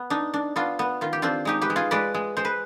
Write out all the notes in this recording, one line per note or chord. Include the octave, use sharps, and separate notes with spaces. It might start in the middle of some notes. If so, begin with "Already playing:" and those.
Already playing: B3
D4 D#4
D4
B3 D4 F4
B3
D#3 F4
G4
C4 D4 F4
G#3 D#4 G4
G4 B4
G#3
F4 G#4
G#3 B4 D5
G#3
G#3 C5
B4